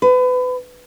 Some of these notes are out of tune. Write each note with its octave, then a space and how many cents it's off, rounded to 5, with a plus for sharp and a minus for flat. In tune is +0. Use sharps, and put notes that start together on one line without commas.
B4 +30